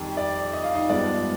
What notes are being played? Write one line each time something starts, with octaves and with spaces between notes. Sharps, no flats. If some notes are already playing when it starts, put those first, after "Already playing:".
Already playing: F2 D#3 G3 D#4
D5
D#5
F5
D#4 D#5
G2 F3 G#3 B3 D5